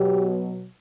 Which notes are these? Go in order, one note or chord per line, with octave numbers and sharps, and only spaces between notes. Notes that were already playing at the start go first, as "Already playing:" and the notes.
Already playing: B2 F#3 G4